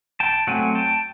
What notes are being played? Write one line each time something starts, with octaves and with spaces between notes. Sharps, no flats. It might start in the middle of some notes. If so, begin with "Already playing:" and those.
G5 A5
F#3 A3 C4 F#5 G#5
G5 A5